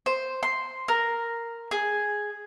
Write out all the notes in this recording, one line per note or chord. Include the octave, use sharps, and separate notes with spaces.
C5
C6
A#4
G#4